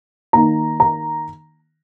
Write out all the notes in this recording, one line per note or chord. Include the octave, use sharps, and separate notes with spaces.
D#3 A#3 A#5
A#5